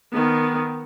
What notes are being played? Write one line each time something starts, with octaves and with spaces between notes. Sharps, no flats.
D#3 B3